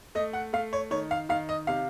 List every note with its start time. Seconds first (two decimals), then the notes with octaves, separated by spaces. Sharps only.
0.15 A3 D#5
0.33 F#5
0.53 A3 F5
0.73 C#5
0.91 D#3 C#5
1.11 F5
1.29 D#3 F5
1.49 D#5
1.67 C3 F5